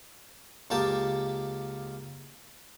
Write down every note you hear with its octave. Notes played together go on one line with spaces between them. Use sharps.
C#2 A#3 G4 A5